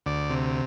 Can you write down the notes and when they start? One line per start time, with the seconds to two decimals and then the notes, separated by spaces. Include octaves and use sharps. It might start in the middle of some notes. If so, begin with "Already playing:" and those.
0.06 D2 D5
0.30 C3